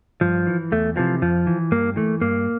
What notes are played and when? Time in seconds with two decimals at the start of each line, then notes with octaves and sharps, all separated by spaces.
0.21 G2 F3
0.47 E3
0.72 E2 A3
0.96 C3 E3 F3
1.22 F2 F3
1.47 E3
1.72 G2 A#3
1.96 E3 A3
2.22 G2 A#3